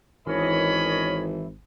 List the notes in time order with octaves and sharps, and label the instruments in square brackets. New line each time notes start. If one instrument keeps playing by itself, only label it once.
[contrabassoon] G#1 [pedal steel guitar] E3 [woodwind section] C#4 A#4 C#5 [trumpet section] D#5 B5